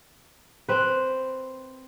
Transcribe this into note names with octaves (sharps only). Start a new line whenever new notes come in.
C4 B4